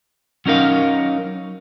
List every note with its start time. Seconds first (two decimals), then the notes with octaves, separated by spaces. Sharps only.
0.46 F#3 C#4 D#4 A#4 F5